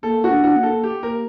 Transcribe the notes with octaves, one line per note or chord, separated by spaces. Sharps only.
A#3 A4
F#4
D4
F#4
A#3
A4
G4
A#3 A#4